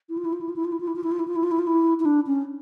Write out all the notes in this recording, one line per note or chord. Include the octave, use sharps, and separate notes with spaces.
E4
F4
E4
F4
E4
F4
E4
F4
E4
F4
E4
F4
E4
F4
E4
F4
E4
F4
E4
F4
E4
E4
D4
C#4